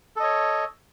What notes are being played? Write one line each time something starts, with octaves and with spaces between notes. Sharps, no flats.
A4 C#5 D#5